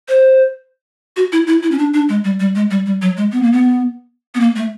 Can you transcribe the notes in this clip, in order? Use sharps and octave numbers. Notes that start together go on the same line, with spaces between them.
C5
F#4
E4
E4
E4
C#4
D4
D4
G#3
G3
G3
G#3
G3
G3
F#3
G#3
B3
A#3
B3
B3
A#3
A3